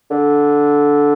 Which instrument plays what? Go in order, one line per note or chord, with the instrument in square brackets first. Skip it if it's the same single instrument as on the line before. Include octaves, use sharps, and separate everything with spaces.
[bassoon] D3